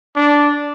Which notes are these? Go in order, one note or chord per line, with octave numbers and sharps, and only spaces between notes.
D4